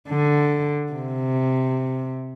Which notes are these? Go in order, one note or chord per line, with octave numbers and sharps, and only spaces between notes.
D3
C3